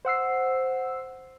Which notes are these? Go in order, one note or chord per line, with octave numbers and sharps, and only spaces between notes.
C5 F#5 E6 C7